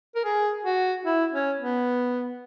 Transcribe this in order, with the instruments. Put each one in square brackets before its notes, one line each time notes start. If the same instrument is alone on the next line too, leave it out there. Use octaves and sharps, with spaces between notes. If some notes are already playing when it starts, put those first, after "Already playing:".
[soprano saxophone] A#4
G#4
F#4
E4
C#4
B3